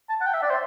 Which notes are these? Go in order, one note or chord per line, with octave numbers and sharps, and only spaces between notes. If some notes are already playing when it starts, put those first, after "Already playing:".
A5
F#5
G5
E5
D5
C5